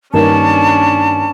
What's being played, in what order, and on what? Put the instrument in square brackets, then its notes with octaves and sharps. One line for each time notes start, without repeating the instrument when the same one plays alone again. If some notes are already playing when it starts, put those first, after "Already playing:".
[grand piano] G2 D#3 A#3 [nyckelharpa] C#4 D4 [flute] A5